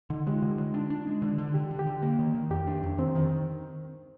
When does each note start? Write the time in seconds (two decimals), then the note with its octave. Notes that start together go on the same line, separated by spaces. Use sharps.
0.10 D3 D#4
0.27 G#3 G4
0.34 F4
0.42 D3
0.58 G#3
0.74 D4
0.90 D4
1.07 G#3
1.22 D3
1.38 D3
1.54 D3 G4
1.71 D3
1.79 G4
1.87 D3
2.02 A#3
2.19 D#3
2.34 D#3
2.51 F2 G4
2.67 D4
2.83 F2
2.98 D#3 C4
3.15 D#3